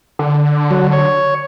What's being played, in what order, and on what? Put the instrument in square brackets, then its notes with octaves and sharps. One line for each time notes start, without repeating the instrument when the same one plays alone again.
[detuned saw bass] D3
[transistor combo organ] F#3
C#5